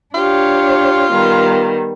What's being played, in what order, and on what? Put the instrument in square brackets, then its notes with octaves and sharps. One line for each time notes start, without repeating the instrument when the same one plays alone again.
[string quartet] D4 G4 C#5 [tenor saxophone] F4
[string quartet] D#3 G3 B3